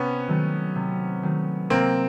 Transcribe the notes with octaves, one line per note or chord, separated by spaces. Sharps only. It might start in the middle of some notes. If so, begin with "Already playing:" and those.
Already playing: C3 B3 C#4
D#3 F#3 A3
C3
D#3 F#3 A3
C3 A#3 C4